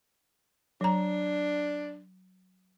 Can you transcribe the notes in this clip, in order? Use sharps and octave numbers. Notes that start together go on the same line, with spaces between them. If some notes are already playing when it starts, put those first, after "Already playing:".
F#3 D4 A#5